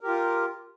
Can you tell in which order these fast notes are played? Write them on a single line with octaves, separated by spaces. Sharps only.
A#4 G4 F4